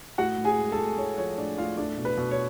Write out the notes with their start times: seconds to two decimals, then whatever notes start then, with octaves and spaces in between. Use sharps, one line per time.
0.18 A2 F#4 F#5
0.38 A2
0.45 G#4 G#5
0.58 G#3
0.72 A4 A5
0.78 A2
0.98 A2 C#5
1.18 F3 C#5
1.37 A2 D4 D5
1.58 A2 F4 F5
1.77 A3 D4 D5
1.98 B2
2.05 B4
2.18 B2
2.31 C#5